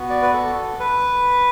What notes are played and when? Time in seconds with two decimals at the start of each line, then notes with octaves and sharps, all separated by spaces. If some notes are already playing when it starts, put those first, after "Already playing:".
Already playing: B3 F#4
0.10 D5
0.22 B4
0.33 A4
0.80 B4